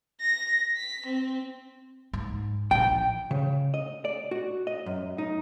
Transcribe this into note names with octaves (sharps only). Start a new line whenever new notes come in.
A#6
B6
C4
G#2
A#1 F3 G5
C#3
D#5
D5
F#4
D#5
F#2
D#4